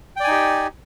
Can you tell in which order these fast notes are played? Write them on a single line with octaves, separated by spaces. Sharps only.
G5 D5 G#5 D#4 G4